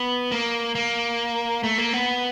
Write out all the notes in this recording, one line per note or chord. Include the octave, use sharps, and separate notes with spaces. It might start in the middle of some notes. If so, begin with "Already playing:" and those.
Already playing: B3
A#3
A#3
A3
A#3
B3